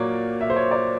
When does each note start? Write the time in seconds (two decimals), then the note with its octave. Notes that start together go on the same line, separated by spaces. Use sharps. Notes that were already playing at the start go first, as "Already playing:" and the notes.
Already playing: A#2 F#3 A#3 C#5 D5
0.41 E5
0.50 C5
0.56 C#5
0.71 D5